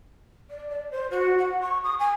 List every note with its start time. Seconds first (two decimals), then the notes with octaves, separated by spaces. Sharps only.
0.50 D5
0.70 D5
0.91 C5
1.10 F#4
1.38 F#5
1.61 C#6
1.83 D#6
1.99 G#5